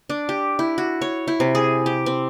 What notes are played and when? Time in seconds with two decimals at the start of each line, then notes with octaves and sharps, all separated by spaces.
0.09 D4
0.29 G4
0.59 E4
0.78 F#4
1.01 C#5
1.27 E4
1.40 C3
1.55 G#4
1.86 G4
2.06 C4